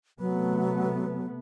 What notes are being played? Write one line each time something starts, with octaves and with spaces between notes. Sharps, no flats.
C3 F#3 A3 B3